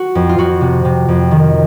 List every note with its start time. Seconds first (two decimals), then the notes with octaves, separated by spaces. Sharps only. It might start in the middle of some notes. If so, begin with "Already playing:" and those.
Already playing: F#4
0.15 F2
0.29 F4
0.38 F2 F#4
0.61 C3
0.85 C3
1.08 F2
1.31 D#3